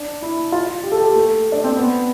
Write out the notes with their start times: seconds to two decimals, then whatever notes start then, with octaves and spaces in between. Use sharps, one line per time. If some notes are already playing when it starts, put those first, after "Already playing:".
Already playing: D4
0.22 E4
0.52 F4
0.83 G4
0.92 A4
1.00 G4
1.15 A3
1.52 D4
1.64 C4
1.77 B3